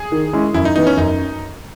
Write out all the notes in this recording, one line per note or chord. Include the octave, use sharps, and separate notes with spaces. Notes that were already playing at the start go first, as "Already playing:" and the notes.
Already playing: G#4
D#3
G#3 C#4 E4
F#2 E4
D#4
E3 B3 D#4
C#4
F#2 D#4